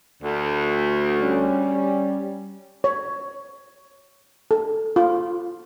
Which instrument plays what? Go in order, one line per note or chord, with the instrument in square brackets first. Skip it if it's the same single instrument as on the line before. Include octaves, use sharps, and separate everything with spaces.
[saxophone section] D2
[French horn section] G3 C#4
[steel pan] C#5
A4
F4